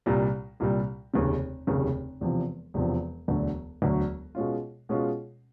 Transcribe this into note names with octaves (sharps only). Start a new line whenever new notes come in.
C2 A#2 G3
C2 A#2 G3
F1 D#2 C#3
F1 D#2 C#3
E1 E2 C3 F3
E1 E2 C3 F3
E1 D2 D3 F#3
E1 D2 D3 F#3
B2 G#3 C#4 F4
B2 G#3 C#4 F4